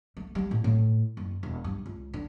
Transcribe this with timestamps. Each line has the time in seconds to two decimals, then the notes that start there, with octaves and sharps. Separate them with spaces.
0.17 A3
0.35 G3
0.51 A2
0.64 A2
1.17 F#1
1.43 E1
1.64 G2
1.86 C#2
2.14 D3